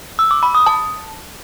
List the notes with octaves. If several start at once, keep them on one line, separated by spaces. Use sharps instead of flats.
E6
D6
B5
D#6
A5